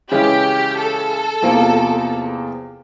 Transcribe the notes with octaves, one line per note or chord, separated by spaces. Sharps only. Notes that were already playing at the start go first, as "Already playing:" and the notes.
C#3 E3 G#3 C#4 G4
A4
E2 C3 F3 A#3